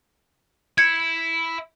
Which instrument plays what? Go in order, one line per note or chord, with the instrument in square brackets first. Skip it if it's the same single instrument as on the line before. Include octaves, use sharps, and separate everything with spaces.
[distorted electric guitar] E4 [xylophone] G#6 C#7